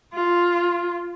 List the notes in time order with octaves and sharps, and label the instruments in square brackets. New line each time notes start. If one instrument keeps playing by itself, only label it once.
[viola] F4